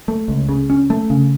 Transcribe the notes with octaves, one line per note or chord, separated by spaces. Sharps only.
A3
C#2
C#3
C#4
A3
C#3